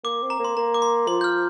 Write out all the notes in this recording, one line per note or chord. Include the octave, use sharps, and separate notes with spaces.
A#3 D6
C4
A#5
A#3
C6
A#3 A#5
D6
C6
F3 C6
G6
F6